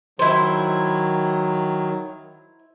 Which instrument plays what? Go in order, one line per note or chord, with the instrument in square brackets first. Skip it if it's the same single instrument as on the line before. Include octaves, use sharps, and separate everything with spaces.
[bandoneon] D#3 F#3 [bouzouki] E4 C5